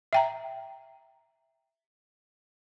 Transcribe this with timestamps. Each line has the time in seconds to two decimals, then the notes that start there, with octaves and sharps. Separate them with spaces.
0.13 E5 G5 A#5